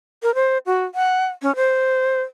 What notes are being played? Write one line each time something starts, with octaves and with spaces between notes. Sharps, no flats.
A#4
C5
F#4
F#5
C#4
C5